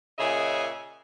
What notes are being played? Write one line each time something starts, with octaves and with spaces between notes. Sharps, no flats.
A#2 C#3 G#4 D#5 E5